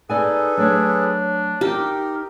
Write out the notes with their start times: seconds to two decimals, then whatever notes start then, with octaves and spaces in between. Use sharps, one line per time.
0.10 D#4 G#4 A4 B4 D5 G#5
0.57 F#3 A3 D4 C#5
1.61 D#4 G4 A#4